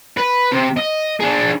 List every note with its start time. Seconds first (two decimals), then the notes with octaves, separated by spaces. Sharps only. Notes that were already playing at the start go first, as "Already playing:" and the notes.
0.17 B4
0.52 C3
0.77 D#5
1.20 D4 G#4